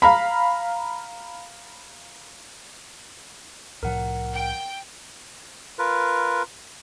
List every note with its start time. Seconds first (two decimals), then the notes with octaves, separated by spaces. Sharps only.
0.02 F5 A#5 B5
3.83 C2 A2 F3 A#4 F#5
4.33 G5
5.79 F4 A#4 B4